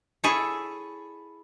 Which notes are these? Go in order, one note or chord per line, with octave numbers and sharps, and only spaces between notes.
E4 G#4 A4 C#5